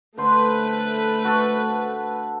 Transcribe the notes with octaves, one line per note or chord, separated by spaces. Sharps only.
D3 A3 B4 C5
F#4 A4